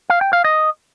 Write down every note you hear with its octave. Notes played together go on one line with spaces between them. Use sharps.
F5
G5
F5
D#5